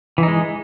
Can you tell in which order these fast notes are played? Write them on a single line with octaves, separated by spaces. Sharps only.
E3 D#4 G#3